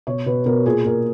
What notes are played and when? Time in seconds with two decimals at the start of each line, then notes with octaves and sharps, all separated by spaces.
0.07 B2 C#5
0.26 B2 B4
0.46 B2 A#4
0.65 A#2 G#4
0.85 A#2 A#4